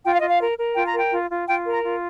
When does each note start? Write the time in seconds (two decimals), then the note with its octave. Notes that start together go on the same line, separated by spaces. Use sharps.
0.05 F4 G5
0.13 F5
0.22 F4 D#5
0.30 F5
0.41 A#4
0.58 A#4
0.76 F4 G5
0.87 A#5
0.94 A#4 G5
1.12 F4
1.30 F4
1.48 F4 G5
1.66 A#4
1.71 A#5
1.83 F4